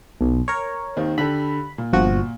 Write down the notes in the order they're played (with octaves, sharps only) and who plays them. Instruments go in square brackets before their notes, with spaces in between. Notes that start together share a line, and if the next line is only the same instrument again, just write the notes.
[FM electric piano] B1
A#4 C#5
[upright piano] D#2 D#3 C4
[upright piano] D3 G4 A4 [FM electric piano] B5
[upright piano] A#2
[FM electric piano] G1 F3 F#4